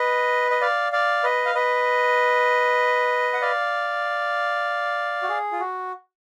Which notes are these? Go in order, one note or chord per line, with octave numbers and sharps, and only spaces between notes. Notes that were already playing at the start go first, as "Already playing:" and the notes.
Already playing: B4 D#5
D#5
D5 F5
D5 F5
B4 D#5
F5
B4 D#5
F#5
D5 F5
F#4
G#4
F4
F#4